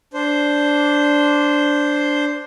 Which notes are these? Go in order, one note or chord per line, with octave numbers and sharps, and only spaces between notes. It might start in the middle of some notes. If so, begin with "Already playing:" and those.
D4 C5